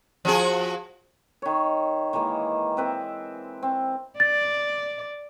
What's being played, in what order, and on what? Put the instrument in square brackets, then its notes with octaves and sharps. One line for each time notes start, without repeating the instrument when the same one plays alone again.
[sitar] F3 F#4 G#4
[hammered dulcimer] D#3 C#5
D#3 E3 G#3 A#3
C4 B4 E5
C4
[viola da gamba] D5 [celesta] A6